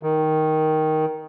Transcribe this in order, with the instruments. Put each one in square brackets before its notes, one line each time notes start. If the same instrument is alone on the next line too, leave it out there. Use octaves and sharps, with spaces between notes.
[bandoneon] D#3